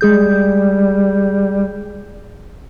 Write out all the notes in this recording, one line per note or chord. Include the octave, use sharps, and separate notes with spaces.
G3 G#3 G#4 G6